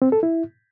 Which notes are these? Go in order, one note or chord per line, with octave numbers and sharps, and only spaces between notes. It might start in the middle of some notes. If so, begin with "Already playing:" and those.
C4
A4
E4